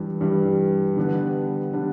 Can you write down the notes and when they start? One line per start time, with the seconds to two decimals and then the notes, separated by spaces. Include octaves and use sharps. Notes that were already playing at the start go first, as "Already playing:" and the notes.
Already playing: G2 E3 G3
0.21 G2 E3 G3
0.97 D3 G3 B3 D4
1.73 D3 G3 B3 D4